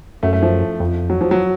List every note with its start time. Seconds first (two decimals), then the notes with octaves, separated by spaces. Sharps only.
0.23 F#2 A3
0.33 A3
0.43 F3
0.80 F2
1.10 F#3
1.21 F3
1.31 F#3